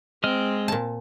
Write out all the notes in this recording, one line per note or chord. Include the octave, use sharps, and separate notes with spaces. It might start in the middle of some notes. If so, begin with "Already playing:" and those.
G#3 C4 D#5 F6
A#2 A5